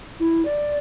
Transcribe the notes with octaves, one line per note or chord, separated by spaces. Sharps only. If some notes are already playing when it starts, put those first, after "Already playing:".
E4
D5